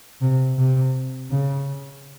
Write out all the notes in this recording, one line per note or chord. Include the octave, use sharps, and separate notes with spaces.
C3
C3
C#3